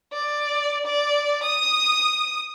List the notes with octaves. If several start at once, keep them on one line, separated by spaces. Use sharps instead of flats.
D5
D5
D#6